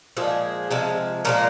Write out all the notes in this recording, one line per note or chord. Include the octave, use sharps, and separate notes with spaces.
A#2 F3 G#3 G#4
C3 F3 G#3
A#2 F3 G#3 A#4